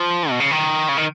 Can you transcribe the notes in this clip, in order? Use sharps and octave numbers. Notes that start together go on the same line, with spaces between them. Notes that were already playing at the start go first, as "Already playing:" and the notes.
Already playing: F3
B2
C#3
D#3
C#3
D#3